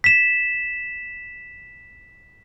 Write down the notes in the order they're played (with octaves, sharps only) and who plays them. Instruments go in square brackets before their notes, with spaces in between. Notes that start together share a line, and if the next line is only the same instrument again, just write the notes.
[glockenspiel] B6 E7